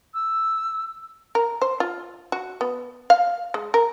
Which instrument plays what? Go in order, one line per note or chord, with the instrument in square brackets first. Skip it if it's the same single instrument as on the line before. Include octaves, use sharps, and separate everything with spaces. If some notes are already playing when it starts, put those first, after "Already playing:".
[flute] E6
[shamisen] A#4
C5
F4
F#4
B3
F5
G#3
A#4